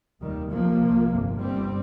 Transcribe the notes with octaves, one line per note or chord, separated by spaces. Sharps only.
F1 D#2 D#3 G3
C2 C3 F3 A#3
C2 C3
G1 F2 C3
G1 G2 G3 C4